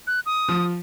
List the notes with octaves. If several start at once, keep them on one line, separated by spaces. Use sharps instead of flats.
F#6
D#6
F3